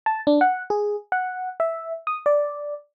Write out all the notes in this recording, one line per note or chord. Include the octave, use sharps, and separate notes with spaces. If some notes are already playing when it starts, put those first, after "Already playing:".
A5
D4
F#5
G#4
F#5
E5
D#6
D5